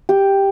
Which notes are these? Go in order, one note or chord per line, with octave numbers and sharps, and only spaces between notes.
G4